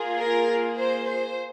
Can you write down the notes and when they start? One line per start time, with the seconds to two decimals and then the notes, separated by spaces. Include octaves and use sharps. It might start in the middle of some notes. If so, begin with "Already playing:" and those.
Already playing: A#3 F4 G#4
0.20 A#4
0.78 C5
1.07 C5